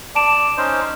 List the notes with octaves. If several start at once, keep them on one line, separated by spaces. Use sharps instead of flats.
D5 A5 D7 E7
C#4 D#4 C5